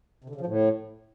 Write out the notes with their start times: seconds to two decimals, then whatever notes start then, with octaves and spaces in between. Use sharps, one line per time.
0.24 C3
0.30 D3
0.35 C#3
0.41 F3
0.46 A2